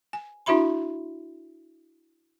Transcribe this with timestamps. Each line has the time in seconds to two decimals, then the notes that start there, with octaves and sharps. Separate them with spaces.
0.13 G#5
0.46 D4 E4 F#4 E5 B5 C6